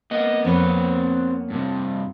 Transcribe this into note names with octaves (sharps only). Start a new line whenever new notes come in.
A#3 B3 D#5
F2 C4 B4 C#5
G2 C3